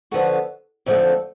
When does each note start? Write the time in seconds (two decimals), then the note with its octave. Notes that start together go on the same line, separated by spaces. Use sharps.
0.11 D3 F3 B3 F#4 A4
0.86 F2 D3 F3 A3